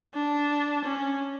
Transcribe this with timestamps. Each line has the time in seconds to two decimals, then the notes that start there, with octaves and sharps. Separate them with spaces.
0.14 D4
0.85 C#4